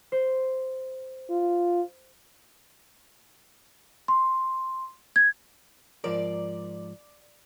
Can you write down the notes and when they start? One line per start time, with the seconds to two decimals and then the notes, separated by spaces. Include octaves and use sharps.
0.12 C5
1.30 F4
4.08 C6
5.16 G#6
6.04 G#2 F3 A#4 D5